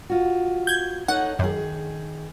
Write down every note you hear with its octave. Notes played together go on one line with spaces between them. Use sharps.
F4 F#4
G6 G#6
D#4 A4 C#5 F#5
F#2 D#3 G#4